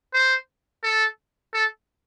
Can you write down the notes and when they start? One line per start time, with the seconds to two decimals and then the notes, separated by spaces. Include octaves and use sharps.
0.14 C5
0.83 A4
1.54 A4